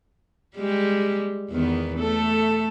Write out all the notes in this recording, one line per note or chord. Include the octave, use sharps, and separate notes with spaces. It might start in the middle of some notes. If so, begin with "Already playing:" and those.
G3 G#3 G4
E2 D#3 B3
A3 A4